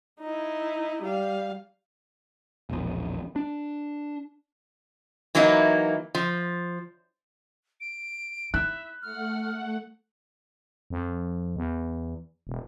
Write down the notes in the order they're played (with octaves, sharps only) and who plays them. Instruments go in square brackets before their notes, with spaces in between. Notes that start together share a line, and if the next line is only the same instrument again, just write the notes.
[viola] D#4 E4
G3 F5
[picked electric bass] E1 A#1
D4
[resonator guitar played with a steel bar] E3 F#3 A#3 D#4 E4
F3
[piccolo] D7
[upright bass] E4 [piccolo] E5 [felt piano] F#6
[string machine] A3 F#5 [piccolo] F6
[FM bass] F2
E2
E1